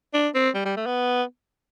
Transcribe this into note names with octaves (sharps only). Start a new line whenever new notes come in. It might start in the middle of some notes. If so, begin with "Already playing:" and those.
D4
C4
G3
G3
A3
B3